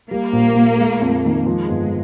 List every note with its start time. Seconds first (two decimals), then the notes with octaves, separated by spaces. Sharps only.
0.10 G3 A#3
0.33 A#1
0.55 A#2
0.78 G#3
1.02 F2
1.24 D#3
1.46 F3 G#3
1.69 G1